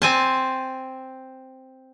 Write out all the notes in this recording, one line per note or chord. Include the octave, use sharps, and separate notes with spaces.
C4 G#5 A5